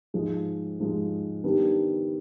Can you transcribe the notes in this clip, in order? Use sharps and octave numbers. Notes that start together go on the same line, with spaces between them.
G#2 F3 G#3
G#2 F3 G#3
D#3 G3 B3 D4